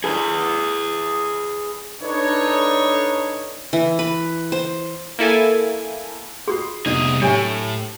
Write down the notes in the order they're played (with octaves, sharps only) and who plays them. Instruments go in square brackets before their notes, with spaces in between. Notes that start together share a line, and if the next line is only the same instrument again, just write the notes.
[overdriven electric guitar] G#4 B4
[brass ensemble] D4 D#4 A4 B4 C#5
[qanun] E3
B4
C5
[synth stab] A#3 E4 A4 G#5
[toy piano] F4 F#4 G#4 [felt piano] C6 D#6 C7
[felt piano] F1 B3 D#4 [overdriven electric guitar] C2 G#4 [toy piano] D5 D#5
[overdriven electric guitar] A2 [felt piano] F#3 C#5 E5 [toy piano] D4 G4 G#5